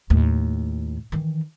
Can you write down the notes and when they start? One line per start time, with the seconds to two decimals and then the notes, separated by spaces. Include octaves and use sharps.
0.10 D#2 A2
1.12 D#3 E3